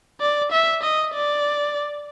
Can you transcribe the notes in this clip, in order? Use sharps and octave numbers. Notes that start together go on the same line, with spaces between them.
D5
E5
D#5
D5